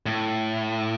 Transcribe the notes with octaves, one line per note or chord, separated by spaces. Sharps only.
A2